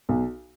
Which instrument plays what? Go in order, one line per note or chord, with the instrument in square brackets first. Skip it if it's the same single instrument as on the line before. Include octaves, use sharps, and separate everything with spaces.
[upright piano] B1